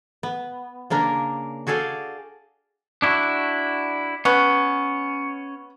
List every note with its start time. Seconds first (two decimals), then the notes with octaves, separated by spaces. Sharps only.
0.23 B3
0.90 C#3 A#3 D4 A#4
1.67 F#4 G#4 A4 D5 F5 G5
3.02 D4 E4 F#4
4.25 B3 C#4